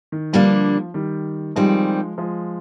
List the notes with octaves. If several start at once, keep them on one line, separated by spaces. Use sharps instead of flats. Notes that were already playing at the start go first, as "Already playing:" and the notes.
D#3
D3 F3 G3 A#3 D4
D#3 G3
D#3 F3 G3 G#3 C4
F3 G#3